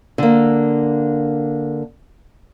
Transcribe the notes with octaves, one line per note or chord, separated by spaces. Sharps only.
D3 A#3